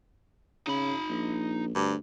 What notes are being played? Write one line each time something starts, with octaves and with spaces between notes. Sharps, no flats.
C#3 D#4 B5
A#1
D2 G2